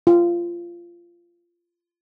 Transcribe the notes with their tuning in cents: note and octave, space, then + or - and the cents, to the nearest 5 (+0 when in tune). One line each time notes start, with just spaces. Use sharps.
F4 -20